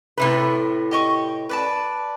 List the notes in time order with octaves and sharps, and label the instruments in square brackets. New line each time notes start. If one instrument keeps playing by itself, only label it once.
[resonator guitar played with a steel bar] A2 C3 B4
[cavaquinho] G4 D#5 C#6
B4 D5 A5